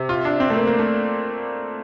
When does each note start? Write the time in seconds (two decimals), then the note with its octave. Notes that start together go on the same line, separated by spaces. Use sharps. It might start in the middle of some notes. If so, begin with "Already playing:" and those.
Already playing: C3
0.09 F4
0.25 D4
0.40 C4
0.50 A3
0.56 A#3
0.67 A#3
0.79 A3